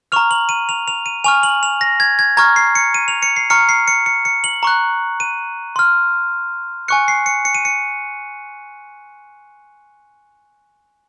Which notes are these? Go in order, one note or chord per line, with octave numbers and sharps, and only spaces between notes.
A#5 C#6 F6 F7
F#7
D#7
F7
F7
D#7
G#5 C#6 F6 F7
F#7
F7
A#6
G#6
G#6
A#5 C#6 F6 G#6
C7
C#7
D#7
F7
C#7
C7
A#5 C#6 F6 C#7
C7
C#7
C#7
C#7
F#7
A#5 C#6 F#6
D#7
C6 F6
G#5 C#6 F#6 C#7
C7
C#7
C#7
D#7
C#7